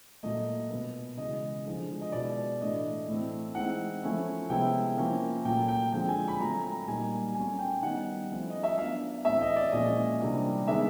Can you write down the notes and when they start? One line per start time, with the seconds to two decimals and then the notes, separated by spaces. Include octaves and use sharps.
0.23 A#2 F#3 A3 D#5
0.70 B2 F#3 B3
1.17 C#3 E3 G#3 D#5
1.66 D3 F3 G#3
2.01 D#5
2.12 B2 G#3 B3 E4 D5
2.60 A2 E3 A3 D4 D#5
3.08 A2 E3 A3 C4
3.55 E3 G#3 C4 D#4 F#5
4.03 F3 A3 C#4 E4
4.50 C3 F3 G#3 B3 E4 G5
4.97 F3 A#3 C#4 E4
5.45 A#2 F#3 A3 G5
5.68 G5
5.92 D3 F3 G#3 C4 G5
6.09 G#5
6.28 B5
6.40 F#3 A3 C4 A#5
6.64 A#5
6.88 A#2 G3 A#3 D#4 G#5
7.34 F#3 A3 C#4 G#5
7.59 G5
7.82 D#3 G3 B3 D#4 F#5
8.30 F3 A3 C#4 E4
8.50 D#5
8.63 E5
8.77 F#3 B3 D4 F5
9.25 A2 E3 A3 C4 E5
9.41 D#5
9.56 D5
9.72 A#2 F3 G#3 C#4 D#5
10.21 C3 E3 G3 A#3 D4
10.67 D#3 G#3 B3 D4 E5